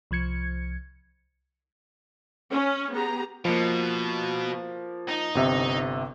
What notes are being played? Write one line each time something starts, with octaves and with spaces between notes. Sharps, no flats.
C2 F3 G#6 C#7
C#4
B3 G4 G#4 A#5
B2 F3 A#3
D#4
G1 C3 E5